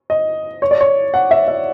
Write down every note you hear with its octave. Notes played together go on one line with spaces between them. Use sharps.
D#5
C#5
D5
C#5
F#5
E5
E5